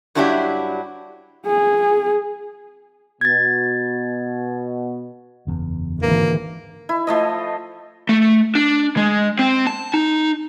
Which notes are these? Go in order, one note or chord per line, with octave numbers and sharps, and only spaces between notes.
G2 F#3 D4 E4 F#4 G4
G#4
B2 G#6 A6
F#1 E2
G#1 D3 E3 A#3
E4
F3 A3 D#5
A3
D4
G#3
C4
A5
D#4